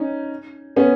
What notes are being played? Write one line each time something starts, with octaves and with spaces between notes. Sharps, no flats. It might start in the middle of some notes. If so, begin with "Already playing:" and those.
Already playing: C#4 D#4
B3 C#4